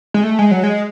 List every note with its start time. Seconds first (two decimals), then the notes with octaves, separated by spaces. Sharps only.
0.14 G#3
0.24 A3
0.39 G#3
0.51 F#3
0.64 G#3